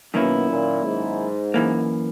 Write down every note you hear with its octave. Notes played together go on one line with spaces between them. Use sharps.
F#2 B2 D#3 A#3 C#4 E4
A#2
G#2
F#2 E3 A#3